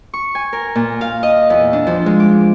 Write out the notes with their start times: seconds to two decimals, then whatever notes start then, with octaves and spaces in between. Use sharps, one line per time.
0.14 C#6
0.35 G#5
0.53 A#4
0.75 A#2
1.01 F5
1.23 D#5
1.50 E2
1.73 D4
1.87 F3
2.06 G#3
2.20 D6